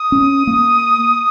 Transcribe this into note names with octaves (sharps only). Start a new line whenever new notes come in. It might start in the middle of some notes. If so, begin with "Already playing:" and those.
Already playing: D#6
C#4
A#3